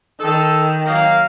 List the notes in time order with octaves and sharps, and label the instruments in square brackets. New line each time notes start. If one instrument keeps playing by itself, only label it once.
[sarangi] D#3 [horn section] A4
[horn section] F#3 A#3 [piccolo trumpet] F5